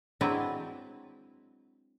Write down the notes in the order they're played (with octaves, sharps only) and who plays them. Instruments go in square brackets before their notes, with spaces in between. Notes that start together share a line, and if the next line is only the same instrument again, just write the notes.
[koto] F#3 G#3 C4 D4 E4 B4